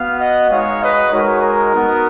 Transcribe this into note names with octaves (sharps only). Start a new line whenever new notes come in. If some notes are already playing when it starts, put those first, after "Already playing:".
Already playing: B3 F#4 F5
D#5 F#5
G#3 D#4 F#4 C#5 F5
B4 D#5
G#3 D#4 F#4 A#4 C#5
A#4
B3 D#4 F#4